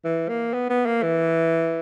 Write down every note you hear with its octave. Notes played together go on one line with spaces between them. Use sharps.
E3
A#3
B3
B3
A#3
E3